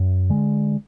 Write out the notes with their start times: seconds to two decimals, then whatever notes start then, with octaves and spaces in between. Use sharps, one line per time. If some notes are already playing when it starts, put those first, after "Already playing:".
Already playing: F#2
0.30 D3 G#3